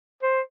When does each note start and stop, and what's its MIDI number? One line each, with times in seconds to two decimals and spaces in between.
0.22 0.41 72